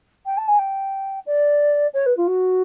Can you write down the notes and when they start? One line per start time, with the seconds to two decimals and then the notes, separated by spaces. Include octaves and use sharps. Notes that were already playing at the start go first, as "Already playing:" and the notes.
0.26 G5
0.37 A5
0.48 G#5
0.59 G5
1.26 D5
1.94 C#5
2.06 B4
2.17 F4
2.27 F#4